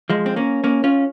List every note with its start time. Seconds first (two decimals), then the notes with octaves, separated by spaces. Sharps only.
0.10 F3 G#3
0.26 C4
0.36 A#3 C#4
0.64 A#3 C#4
0.84 C#4 F4